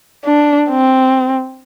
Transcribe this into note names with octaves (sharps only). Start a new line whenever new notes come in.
D4
C4